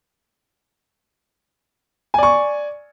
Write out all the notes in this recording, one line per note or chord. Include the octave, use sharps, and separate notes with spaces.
D5 G#5 C#6